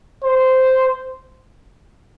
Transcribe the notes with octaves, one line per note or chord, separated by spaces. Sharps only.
C5